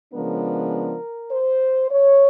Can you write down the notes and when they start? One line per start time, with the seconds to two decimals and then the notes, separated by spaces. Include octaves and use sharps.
0.14 C#3 F3 G#3 B3 D4 A#4
1.32 C5
1.91 C#5